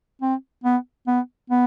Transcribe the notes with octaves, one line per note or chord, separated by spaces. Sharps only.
C4
B3
B3
B3